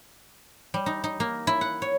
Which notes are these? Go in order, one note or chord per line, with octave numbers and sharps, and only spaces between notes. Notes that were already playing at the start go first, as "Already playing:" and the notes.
G3
D#4
D#4
A#3
E4
F#5
C#5